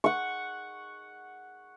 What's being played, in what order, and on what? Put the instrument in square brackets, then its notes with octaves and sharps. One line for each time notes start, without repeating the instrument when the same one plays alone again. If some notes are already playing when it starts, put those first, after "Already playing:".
[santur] F#5 C#6